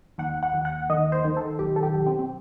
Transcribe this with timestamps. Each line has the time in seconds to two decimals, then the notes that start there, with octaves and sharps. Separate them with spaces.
0.18 D#2 F#5
0.43 F#5
0.54 D#2
0.65 F#5
0.90 D#3 D#5
1.12 C5
1.24 D#3
1.37 A4
1.59 B1 G4
1.76 A4
1.83 G4
1.95 B1
2.07 C4
2.19 C4